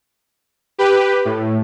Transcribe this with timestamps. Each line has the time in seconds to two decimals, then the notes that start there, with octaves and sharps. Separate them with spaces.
0.78 G4 B4
1.25 A2